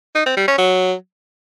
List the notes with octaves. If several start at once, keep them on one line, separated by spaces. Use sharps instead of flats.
D#4
C4
G3
C#4
F#3